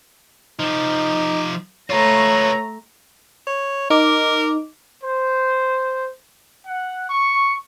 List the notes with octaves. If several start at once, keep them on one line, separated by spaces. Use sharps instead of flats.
F3 D#4 G4
A3 F4 B4 C#5 A#5
C#5
D#4 A#4 D6
C5
F#5
C#6